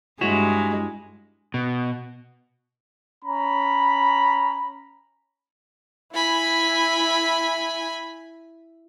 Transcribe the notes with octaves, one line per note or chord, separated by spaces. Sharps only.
G2 G#3 E4 F#4 C#5
B2
C#4 A#5 B5
E4 G#5 B5